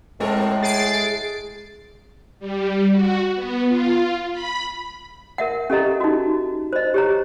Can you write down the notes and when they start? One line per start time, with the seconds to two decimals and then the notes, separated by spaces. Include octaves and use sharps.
0.20 A2 G#3 C4 A4 A#4
0.62 G#4 A6 C7 D7
2.39 G3
2.90 F#4
3.35 B3
3.67 F4
4.32 B5
5.38 A#4 E5 F#5
5.70 C#4 G4 A4 D#5 A#5
6.00 D#4 F#4
6.73 C5 D#5
6.94 G4 C#5 A#5